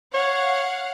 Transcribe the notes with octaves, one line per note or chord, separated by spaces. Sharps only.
C#5 F5 F#5